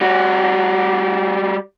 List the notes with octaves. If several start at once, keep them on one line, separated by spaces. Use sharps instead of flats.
G3 F#4